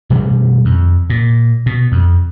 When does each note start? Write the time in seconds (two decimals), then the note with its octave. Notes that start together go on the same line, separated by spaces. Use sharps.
0.10 B2 D#3 G3 A3
0.65 F2
1.10 A#2
1.66 B2
1.92 F2